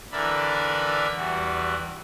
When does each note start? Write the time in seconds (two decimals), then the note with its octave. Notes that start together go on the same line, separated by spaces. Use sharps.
0.12 D3 E3 A#4 D5 E5 B5
1.15 E2 E3 G3 F#4